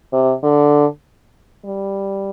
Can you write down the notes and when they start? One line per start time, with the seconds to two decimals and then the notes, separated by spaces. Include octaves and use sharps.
0.13 C3
0.43 D3
1.65 G3